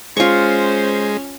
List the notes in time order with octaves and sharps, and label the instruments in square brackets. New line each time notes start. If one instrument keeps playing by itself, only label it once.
[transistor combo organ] G#3 [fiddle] C#4 [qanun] F4 C#6 [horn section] C5